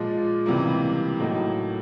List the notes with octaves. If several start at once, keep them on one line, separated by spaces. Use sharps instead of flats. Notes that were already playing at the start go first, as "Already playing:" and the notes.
Already playing: A#2 F3 G#3
C#2 C3 E3 G3 A#3
A2 F#3 A#3 D#4